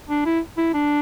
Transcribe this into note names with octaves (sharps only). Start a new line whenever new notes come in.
D4
E4
E4
D4